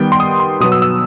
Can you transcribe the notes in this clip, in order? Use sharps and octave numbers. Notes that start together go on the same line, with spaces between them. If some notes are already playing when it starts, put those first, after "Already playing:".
Already playing: D#3 G3 B3 G5
C6
D#6
C6
B2 F#3 B3 D#6
E6
E6